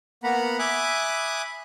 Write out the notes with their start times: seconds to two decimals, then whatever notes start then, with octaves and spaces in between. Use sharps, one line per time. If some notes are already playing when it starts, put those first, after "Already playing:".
0.24 A#3 B3 F#5 A#5 B5
0.59 E5 G#5 B5 D6 D#6 F#6